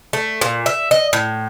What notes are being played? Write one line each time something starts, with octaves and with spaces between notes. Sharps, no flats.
A3
A#2
E5
D#5
A2